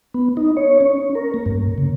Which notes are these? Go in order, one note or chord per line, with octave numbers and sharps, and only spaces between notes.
B3
D#4
C#5
C#4
A#4
A#3
G2
C#3